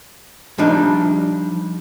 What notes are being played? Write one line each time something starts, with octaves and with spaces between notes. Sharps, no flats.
F3 G3 D4 D#4